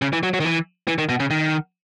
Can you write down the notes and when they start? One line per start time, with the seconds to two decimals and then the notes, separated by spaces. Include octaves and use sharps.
0.02 C#3
0.13 E3
0.23 F#3
0.34 F#3
0.40 D#3
0.45 E3
0.88 E3
0.98 D#3
1.09 B2
1.20 C#3
1.30 D#3